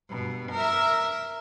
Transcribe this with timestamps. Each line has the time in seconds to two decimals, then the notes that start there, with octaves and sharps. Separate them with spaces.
0.10 G2 B2
0.52 A#4 E5